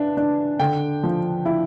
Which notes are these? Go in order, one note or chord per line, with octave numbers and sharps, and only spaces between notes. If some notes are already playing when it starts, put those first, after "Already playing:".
Already playing: E3 D4 A5
D4
D3 G5
F3
E4